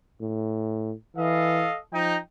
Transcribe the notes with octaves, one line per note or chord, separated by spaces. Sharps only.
A2
E3 A4 D#5 F5
F3 D#4 G5 A#5